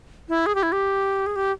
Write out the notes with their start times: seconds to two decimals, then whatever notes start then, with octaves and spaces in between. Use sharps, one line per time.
0.29 E4
0.46 G#4
0.55 G4
0.63 E4
0.72 G4
1.26 G#4
1.36 G4